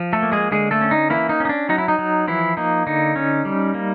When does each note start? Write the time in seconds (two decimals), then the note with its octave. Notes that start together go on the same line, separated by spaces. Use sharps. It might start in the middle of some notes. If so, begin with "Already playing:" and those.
Already playing: F3
0.13 A3 A4
0.22 A#3
0.32 G#3 G#4
0.52 D3 G#3 G#4
0.71 A3 A4
0.81 C#4
0.91 D#4
1.10 E3 A#3 E4
1.29 D#4
1.40 C#4 D#4
1.49 D4
1.69 F#3 D#4
1.78 E4
1.88 D#4
1.99 F#3
2.27 E3 F3 E4
2.57 A#3 D#4
2.87 D3 D#4
3.16 C#4
3.45 G3
3.74 A#3